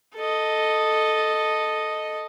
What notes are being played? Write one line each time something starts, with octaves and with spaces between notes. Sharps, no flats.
A4 D#5